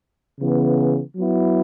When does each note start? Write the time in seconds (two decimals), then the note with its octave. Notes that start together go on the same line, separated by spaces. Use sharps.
0.39 C#3 E3 B3
1.16 F#3 B3 E4